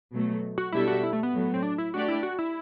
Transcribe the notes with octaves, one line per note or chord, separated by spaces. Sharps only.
B2 F#3 A3
F#4
B2 G3 D4 E4 A4 E5
F#4
E4
A3
B3
A2 F#3 A3
C4
D4
E4
A3 D4 F#4 G4 D5
E4
F#4
E4